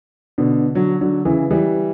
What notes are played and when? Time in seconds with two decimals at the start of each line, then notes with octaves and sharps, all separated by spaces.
0.38 B2 D3
0.75 D3 F#3
1.01 D3 F#3
1.25 C#3 E3
1.51 E3 G3